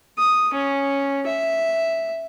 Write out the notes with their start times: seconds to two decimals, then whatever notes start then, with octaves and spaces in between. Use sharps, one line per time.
0.18 D#6
0.54 C#4
1.26 E5